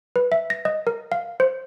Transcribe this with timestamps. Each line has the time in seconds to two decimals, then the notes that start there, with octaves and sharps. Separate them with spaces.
0.16 B4
0.32 E5
0.50 A#6
0.65 D#5
0.87 A#4
1.12 F5
1.40 C5